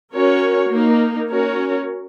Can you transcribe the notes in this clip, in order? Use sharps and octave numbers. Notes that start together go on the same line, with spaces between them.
C#4 F#4 A#4 C#5
A#3 D#4 A#4
C#4 F#4 A#4 C#5